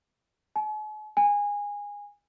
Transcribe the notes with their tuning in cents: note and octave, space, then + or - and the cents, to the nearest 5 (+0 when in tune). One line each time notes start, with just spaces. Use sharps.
G#5 +45
G#5 -20